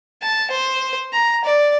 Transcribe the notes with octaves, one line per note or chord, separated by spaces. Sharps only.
A5
C5
A#5
D5